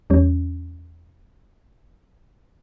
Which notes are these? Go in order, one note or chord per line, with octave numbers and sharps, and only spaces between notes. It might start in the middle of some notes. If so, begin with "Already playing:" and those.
E2 G3 C#4